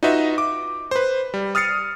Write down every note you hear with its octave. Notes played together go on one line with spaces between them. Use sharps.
D#4 F4 F#4 B4 D#5 E5
D6
B4 C5
G3
D#6 F6 A6 C7 C#7